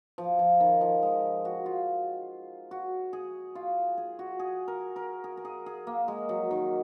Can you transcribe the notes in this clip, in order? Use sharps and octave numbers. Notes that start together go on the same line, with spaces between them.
F3
F3
D#3
F3
G#3
F#4
F4
F#4
G#4
F4
G#4
F#4
G#4
A#4
A#4
G#4
A#4
G#4
G#4
A#3
G#3
F#3
D#3